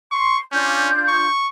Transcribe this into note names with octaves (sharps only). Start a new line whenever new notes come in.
C6 C#6
C#4 D4 F4 G6
C#6